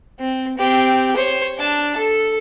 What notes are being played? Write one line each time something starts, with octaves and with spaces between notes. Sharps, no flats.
C4
C4 G4
C5 C#5
D4 A5
A4